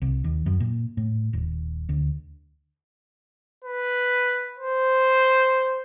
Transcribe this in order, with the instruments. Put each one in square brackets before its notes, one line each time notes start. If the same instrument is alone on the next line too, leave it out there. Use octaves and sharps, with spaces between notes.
[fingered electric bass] C2
D#2
F#2
A#2
A2
D#1
D2
[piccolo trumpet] B4
C5